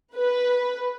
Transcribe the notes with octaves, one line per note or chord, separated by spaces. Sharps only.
B4